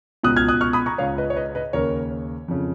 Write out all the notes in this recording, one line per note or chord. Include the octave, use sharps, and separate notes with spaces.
C#2 B2 D#6 F#6
F6 G#6
D#6 F#6
C#6 F6
B5 D#6
A#5 C#6
C#2 C#3 C#5 F5
B4 D#5
C#5
B4 D#5
B4 D#5
D#2 C#3 A#4 C#5
F2 C#3